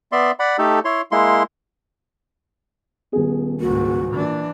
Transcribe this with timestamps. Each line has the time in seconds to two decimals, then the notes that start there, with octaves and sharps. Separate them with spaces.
0.12 B3 D5 E5 C6
0.39 D5 F#5 B5
0.58 A3 D#4 G4 A4
0.85 E4 C#5 C6
1.12 G#3 A#3 E4 C6
3.13 D#1 B3 G#4
3.61 C#2 G#2 A#3 F#4
4.14 A#2 E3 D4